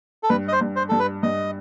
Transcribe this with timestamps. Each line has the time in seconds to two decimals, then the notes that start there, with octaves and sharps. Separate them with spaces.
0.23 A4
0.29 G2 B4
0.48 D#5
0.53 C5
0.61 G2
0.76 C5
0.89 G2 A4
0.99 B4
1.23 G2 D#5